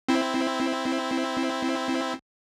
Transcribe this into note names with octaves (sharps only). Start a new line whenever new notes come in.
C4 E4